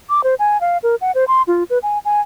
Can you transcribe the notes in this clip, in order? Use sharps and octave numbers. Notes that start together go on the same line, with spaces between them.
D6
C5
G#5
F5
A#4
F#5
C5
C6
F4
B4
G#5
G#5